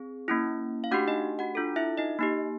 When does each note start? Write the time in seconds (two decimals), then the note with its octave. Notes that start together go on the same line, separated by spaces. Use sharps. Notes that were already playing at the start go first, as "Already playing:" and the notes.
Already playing: C4 G#4
0.28 A#3 C#4 E4
0.84 F5
0.91 A3 D4 F#4 G4 F#5
1.08 D#4 D#5
1.39 F#4 F#5
1.55 D4 F4 A4
1.76 E4 E5
1.97 D#4 D#5
2.19 A#3 D#4 G4